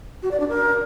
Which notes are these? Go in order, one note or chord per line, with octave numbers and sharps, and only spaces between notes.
F#4
D5
D4
A#4